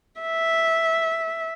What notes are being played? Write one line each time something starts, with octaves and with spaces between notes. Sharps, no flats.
E5